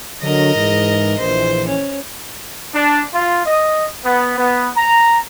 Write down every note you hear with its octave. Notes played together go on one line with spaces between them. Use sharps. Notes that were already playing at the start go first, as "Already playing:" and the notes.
D3 F#3 A#4 D#5
G#2 E3
A#1 E3 C5
C#4
D4
F4
D#5
B3
B3
A#5